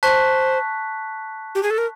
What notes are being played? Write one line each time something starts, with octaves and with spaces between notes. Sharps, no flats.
C5 A5 C#6 F#6 B6
G4
G#4
A4
A#4